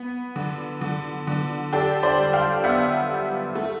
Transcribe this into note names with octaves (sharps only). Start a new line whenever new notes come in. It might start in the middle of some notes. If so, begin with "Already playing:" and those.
Already playing: B3
D3
D3
D3
D4 G4 A4
C5 D5
G3
F5 G5
B3 E5 F#5
G3
A3